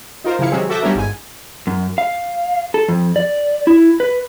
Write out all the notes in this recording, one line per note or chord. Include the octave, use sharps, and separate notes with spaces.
D#4 F4 A#4 C5
C#3 F3 E4 F5 C#7
C3 D#3 F#3 G#3 C4 C#4
F#4 A4 E5 D6 G6 A#6
G3 B3 C#4 D4 A#4 E5
G1 G#2 G#5
F#2
F5
A4
F2
D5
E4
B4